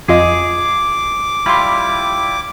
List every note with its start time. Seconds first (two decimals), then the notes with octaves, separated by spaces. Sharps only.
0.08 F2 F4 G#4 D#5 D6
1.46 G3 E4 F4 B5 C6